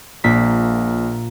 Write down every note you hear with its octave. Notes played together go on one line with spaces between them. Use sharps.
A#1 A#2 A#3 B6